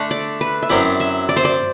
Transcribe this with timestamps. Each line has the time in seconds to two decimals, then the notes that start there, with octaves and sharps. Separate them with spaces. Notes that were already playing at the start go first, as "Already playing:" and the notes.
Already playing: D3 A3 D4
0.11 D5
0.41 B4
0.63 E5
0.69 F#2 F#3 C4 E4 D5
1.00 E5
1.29 D5
1.36 C5
1.45 D5